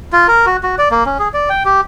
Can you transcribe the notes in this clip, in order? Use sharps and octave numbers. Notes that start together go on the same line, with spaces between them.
F4
A#4
F#4
F#4
D5
A#3
C#4
G#4
D5
G5
G4